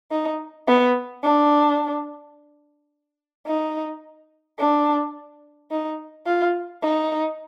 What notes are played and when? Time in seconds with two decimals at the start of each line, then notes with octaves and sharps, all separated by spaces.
0.11 D#4
0.67 B3
1.23 D4
3.47 D#4
4.59 D4
5.71 D#4
6.27 F4
6.83 D#4